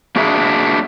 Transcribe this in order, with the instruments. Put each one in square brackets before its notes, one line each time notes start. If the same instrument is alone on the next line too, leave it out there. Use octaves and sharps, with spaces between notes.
[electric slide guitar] A#3 D4 F#4 G#4 E5